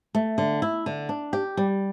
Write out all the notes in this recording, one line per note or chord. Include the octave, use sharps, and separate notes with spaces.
A3
D3
E4
D3
D4
G4
G3